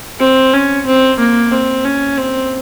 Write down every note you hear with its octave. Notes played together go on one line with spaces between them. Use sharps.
C4
C#4
C4
A#3
C4
C#4
C4